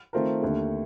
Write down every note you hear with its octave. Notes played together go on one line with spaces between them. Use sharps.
D#3 A3 C4 F4 A#4
D#2 D3 A3